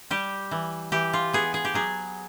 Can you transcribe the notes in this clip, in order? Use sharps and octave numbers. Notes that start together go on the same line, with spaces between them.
G3 G4
E3
E3 G4
F4
B3 G#4
G#4
G4
F#3 G#4